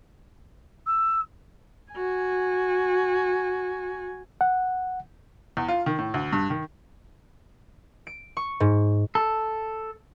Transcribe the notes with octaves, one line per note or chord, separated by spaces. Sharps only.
E6
F#4 G#5
F#5
E2
F4
D#3
A2
D2
G2
D#3
D7
C#6
G#2
A4